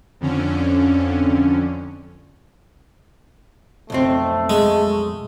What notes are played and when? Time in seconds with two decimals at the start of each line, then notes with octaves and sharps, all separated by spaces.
0.21 F2 D3 C#4
3.90 B1 F2 A3 C4
4.50 G#3